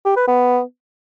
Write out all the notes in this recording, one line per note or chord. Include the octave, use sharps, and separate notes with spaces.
G4
B4
B3